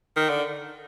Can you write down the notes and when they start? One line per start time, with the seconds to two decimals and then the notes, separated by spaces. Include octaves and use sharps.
0.16 D#3
0.29 D3